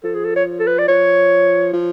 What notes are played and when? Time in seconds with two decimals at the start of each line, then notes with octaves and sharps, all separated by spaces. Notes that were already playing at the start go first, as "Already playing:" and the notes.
0.04 F3 A4
0.14 G#4
0.25 A4
0.36 C#5
0.60 A4
0.67 B4
0.78 D5
0.88 F3 C#5
1.73 F3